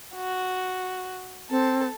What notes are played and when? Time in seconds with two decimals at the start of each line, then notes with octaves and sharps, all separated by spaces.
0.15 F#4
1.50 C4 A4